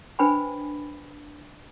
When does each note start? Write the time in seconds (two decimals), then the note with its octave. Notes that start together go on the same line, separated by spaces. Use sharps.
0.19 D4 B4 C5 G5 G#5 B5